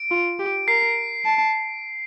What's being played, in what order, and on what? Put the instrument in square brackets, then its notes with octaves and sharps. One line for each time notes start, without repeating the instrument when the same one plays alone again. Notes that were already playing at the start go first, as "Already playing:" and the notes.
Already playing: [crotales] D7
[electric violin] F4
G4
[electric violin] A#4 [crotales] C7
[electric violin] A5